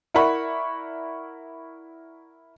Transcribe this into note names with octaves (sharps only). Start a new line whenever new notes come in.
E4 A#4 D5 F#5 B5 C#6